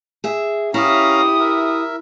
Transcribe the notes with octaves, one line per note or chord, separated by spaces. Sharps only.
G#4 E5
C#4 E4 G4 F5 A#5 D#6
A#4 E5